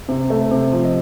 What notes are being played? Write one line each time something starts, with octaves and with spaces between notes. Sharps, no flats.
C3
A3
C3
F3
D#5